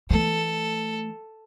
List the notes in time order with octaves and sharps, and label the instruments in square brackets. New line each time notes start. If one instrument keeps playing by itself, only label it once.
[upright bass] E3 A3 [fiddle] A4